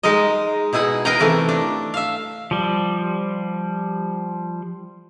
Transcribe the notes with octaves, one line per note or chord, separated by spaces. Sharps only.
G#3 D#4 A#4 D#5
B2 D#4 E4 G#4 F#5
A#4 B4 D#5 F5 G5 A#5
C3 D#3 E3 A3
D4
E5 F5
F3 G3